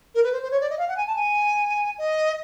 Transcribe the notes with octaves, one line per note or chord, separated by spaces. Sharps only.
A#4
B4
C5
C5
C#5
D5
D#5
F5
F#5
G#5
A5
G#5
D#5